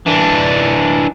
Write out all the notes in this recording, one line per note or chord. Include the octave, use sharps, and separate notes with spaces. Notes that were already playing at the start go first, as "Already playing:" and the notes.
E3 D4